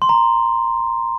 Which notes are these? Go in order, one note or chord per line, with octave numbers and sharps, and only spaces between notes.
C6
A#5